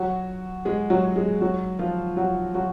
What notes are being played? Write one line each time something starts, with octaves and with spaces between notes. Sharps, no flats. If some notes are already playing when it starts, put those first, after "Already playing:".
Already playing: F#3 F#4
G#3 G#4
F#3 F#4
G#3 G#4
F#3 F#4
F3 F4
F#3 F#4
F#3 F#4